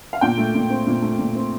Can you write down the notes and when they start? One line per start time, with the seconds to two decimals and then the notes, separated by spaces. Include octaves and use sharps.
0.13 F5
0.21 A#2 G5
0.38 A3
0.55 A#2
0.70 C4
0.86 A#2
1.02 A3
1.19 A#2
1.35 C4